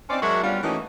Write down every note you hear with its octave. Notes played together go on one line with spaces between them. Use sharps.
C4 C#4 D#4 C5 D5
F#3 G#3 D4 F#4 A#4 E5
G3 B3 C#4 D4 F4
E3 A3 A#3 C#4 D#4 F#4